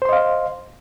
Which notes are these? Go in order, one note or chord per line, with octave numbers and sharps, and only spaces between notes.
C5 D#5 F5 C6